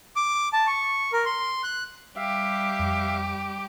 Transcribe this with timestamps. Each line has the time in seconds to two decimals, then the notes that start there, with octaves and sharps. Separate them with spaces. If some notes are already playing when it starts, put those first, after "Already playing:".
0.16 D6
0.53 A5
0.67 C#6
1.13 A#4
1.25 C6
1.63 F#6
2.16 G3 G4 E5 F5
2.79 F2